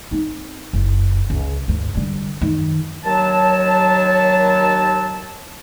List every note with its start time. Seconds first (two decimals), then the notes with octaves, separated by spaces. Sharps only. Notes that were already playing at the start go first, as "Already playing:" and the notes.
0.11 C4 D#4
0.73 F#1
1.30 C#2
1.68 D2 G2
1.95 D3 G3
2.41 F#2 D#3
3.04 D#2 F#3 A5